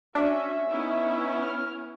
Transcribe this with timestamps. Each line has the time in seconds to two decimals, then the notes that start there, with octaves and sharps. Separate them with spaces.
0.15 C#4 D4 F#4 E5
0.69 B3 C#4 D#4 E4
1.43 F6